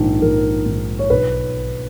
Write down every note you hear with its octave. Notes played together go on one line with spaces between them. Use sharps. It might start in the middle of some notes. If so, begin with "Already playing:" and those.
Already playing: A#1 G#2 D#3
A#1 A#4
G#2 D#3
C#5
B1 B4